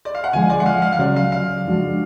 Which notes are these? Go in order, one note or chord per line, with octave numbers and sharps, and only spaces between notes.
D5
F5
F#5
D2 D3 F3 G#3 G#5
D5
F#5
F5
F5
F5
C#2 C#3 F#3 D5
F5
F5
F2 F3 G#3 D4 F#4